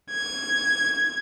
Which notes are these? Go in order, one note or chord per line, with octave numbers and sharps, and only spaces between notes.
G#6